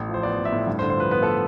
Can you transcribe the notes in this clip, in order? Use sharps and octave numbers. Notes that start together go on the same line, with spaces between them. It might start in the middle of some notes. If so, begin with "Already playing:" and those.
Already playing: A1 A2
F3 C5
B3 D5
A1
E5
A2
G2
C5
D3
C5
F3 B4
B3 B4
A4